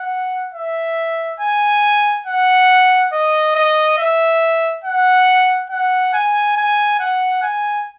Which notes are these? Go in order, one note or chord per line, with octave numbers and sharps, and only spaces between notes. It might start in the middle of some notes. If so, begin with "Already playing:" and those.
Already playing: F#5
E5
G#5
F#5
D#5
D#5
E5
F#5
F#5
G#5
G#5
F#5
G#5